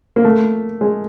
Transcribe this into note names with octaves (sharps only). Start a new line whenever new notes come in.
A#3
A3
G#3